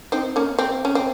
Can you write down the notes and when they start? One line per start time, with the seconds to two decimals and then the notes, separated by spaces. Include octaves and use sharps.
0.12 C4 D#4
0.36 A#3 C#4
0.59 C4
0.85 C#4
0.95 C4